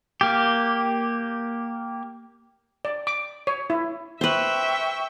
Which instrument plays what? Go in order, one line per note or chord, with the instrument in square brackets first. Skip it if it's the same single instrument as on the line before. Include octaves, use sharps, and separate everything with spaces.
[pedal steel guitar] A#3 G4
[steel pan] D5
D6
C#5
E4
[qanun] B4 C5 [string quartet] E5 G5 C#6